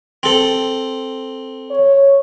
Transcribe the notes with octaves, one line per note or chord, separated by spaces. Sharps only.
C4 A4
C#5